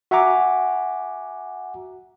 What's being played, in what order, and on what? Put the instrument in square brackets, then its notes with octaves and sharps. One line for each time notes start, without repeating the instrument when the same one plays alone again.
[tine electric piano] F#4 E5 F#5 G#5 A#5 D6